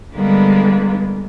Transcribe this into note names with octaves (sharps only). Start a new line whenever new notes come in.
D3 G3 G#3 A#3 B3